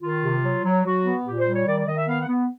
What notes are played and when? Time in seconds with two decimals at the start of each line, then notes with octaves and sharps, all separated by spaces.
0.02 D#3 F4
0.22 C3
0.43 F#3
0.64 F#3
0.84 F#3 F#4
1.04 B3
1.25 A#2 G4
1.38 C5
1.46 G3
1.53 C#5
1.66 D#3 D5
1.77 D5
1.87 D#3 D#5
1.98 E5
2.07 B3 F5
2.21 F#5
2.28 B3